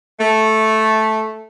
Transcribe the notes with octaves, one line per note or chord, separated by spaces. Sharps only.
A3